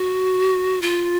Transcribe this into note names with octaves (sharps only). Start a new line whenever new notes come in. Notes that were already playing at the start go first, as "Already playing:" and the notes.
Already playing: F#4
F4